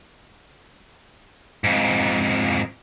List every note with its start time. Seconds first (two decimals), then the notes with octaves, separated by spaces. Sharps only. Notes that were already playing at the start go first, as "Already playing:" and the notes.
1.64 F2 G#2